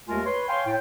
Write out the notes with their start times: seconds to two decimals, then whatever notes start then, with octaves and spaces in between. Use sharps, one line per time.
0.09 D#2 G#3 A3 F4 A#4 G#5
0.25 B4 C#5 C6
0.49 C#5 F5 G5 G#5 C6
0.67 A2 G5